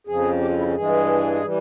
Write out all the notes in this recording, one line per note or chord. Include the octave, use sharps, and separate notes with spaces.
F2 C#3 F3 G#4
G4
F4
E4
C#4
G2 E3 G#3 G#4
E3 G3